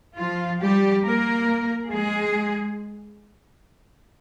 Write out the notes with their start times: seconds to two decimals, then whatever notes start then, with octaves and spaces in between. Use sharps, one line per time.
0.17 F3 F4
0.61 G3 G4
1.04 A#3 A#4
1.91 G#3 G#4